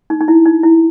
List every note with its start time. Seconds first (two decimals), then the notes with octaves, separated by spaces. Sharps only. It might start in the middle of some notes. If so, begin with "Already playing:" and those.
0.10 D#4
0.21 D#4
0.28 E4
0.45 D#4
0.63 E4